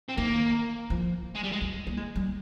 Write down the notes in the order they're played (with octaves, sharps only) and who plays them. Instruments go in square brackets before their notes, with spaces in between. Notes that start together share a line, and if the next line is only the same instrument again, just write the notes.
[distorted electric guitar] C4
[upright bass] D#3 [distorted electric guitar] A#3
[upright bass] F3
[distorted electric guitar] G#3
G3
G#3
[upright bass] G3
A#3
G#3
G3